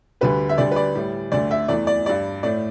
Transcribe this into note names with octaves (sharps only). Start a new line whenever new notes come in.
D2 D3 G3 B4
E5
D2 D3 G3 D5
B4
D5
A2 G3
D2 D3 A3 D5
E5
E2 E3 A3 D5
D5
G2 G3 D5
A2 A3 D5